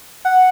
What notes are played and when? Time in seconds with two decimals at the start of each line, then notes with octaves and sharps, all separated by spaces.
0.25 F#5